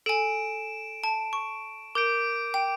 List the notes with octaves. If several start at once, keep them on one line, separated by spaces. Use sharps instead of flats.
A4 G#5 D7 E7
A5
C#6
A#4 D6 G6 D7
G5